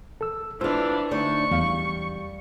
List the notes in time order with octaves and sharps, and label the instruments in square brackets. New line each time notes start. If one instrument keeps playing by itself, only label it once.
[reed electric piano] A4 E6
[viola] E3 D4 [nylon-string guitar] F4 F5 [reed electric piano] C5 E6
[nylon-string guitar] D2 D4 D#4 [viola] C#6
[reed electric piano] E2 F5 [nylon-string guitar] G3